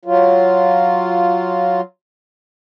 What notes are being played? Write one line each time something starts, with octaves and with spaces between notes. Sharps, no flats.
F#3 F4